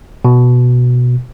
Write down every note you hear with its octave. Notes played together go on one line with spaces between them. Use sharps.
B2